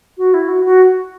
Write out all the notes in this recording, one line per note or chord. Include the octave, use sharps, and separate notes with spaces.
F#4
E4
F#4
F#4